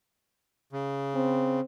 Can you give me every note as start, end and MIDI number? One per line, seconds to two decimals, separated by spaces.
0.73 1.60 49
1.15 1.61 60